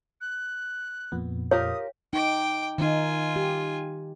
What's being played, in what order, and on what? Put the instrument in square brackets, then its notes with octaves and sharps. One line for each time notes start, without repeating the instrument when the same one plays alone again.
[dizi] F#6
[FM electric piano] F2 A#2 B3
[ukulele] F4 G4 A#4 [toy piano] C#5 [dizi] D#6
[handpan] D#4 [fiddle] G5 D6
[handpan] D#3 D#4 [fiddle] F4 G#5
[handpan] G4